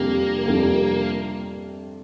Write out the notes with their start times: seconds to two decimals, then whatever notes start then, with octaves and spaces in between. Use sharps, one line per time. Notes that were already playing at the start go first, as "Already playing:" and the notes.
Already playing: F2 C3 G3 A#3 D4 G4
0.47 F2 C3 G3 D4 G4